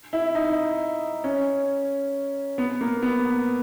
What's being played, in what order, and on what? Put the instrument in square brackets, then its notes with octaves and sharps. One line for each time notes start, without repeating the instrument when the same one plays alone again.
[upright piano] E4
D#4
C#4
B3
A#3
B3